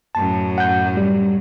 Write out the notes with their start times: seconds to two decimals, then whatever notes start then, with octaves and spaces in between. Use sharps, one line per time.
0.15 F#2 A2 F#3 A5
0.58 F#5 G6
0.97 G3